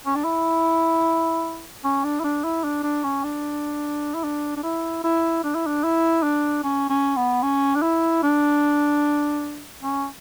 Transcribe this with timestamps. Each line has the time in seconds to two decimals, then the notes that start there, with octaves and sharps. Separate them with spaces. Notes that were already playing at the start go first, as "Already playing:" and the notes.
0.06 C#4
0.16 D4
0.24 E4
1.84 C#4
2.04 D4
2.20 E4
2.24 D4
2.44 E4
2.64 D4
2.83 D4
3.04 C#4
3.24 D4
4.15 E4
4.24 D4
4.57 D4
4.63 E4
5.04 E4
5.44 D4
5.55 E4
5.67 D4
5.84 E4
6.23 D4
6.64 C#4
6.89 C#4
7.16 B3
7.43 C#4
7.75 D4
7.82 E4
8.23 D4
9.82 C#4